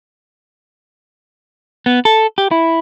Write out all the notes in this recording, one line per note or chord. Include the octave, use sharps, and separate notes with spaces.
B3
A4
G4
E4